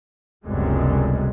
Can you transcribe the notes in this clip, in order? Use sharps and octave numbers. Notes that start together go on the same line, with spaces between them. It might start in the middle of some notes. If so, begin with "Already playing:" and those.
F1 C#2 F#2 B2 G3 G#3